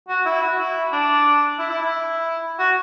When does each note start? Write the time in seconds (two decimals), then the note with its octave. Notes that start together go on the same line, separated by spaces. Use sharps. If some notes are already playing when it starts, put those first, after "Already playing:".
0.09 F#4
0.25 E4
0.42 F#4
0.59 E4
0.92 D4
1.59 E4
1.70 E4
1.81 E4
2.59 F#4